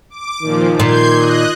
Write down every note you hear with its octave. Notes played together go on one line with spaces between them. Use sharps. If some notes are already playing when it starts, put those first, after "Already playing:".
D6
A#2 D#3 F3
A#2 G6 G#6 C7
D#5 F#6